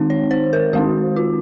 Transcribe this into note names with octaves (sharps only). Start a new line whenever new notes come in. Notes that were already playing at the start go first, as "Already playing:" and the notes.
Already playing: D#3 G#3 C4 D#4
C#5
C5
A#4
D#3 G#3 C4 D#4 F#4
F4